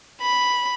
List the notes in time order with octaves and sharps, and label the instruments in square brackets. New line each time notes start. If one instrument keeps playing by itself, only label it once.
[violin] B5